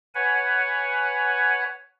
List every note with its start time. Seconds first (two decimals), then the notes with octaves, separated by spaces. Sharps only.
0.15 B4 C#5 F#5 G#5